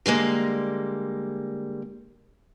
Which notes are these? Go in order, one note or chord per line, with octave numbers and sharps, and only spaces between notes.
D3 G3 G#3 A#3